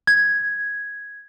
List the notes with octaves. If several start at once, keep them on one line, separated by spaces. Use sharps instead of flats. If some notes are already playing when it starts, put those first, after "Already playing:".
G#6